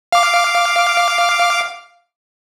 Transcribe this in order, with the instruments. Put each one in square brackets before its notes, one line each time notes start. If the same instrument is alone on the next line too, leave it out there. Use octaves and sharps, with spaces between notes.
[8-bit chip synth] F5 D6